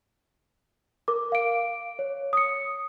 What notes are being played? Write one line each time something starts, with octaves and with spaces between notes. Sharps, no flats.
A#4 D6
F5 D7
C#5
D#6 C#7